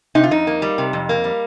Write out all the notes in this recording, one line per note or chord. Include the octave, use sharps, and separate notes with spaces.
C3 D#4
F4
F2 D#4
A#3
G3
C3
F2
A#3
G3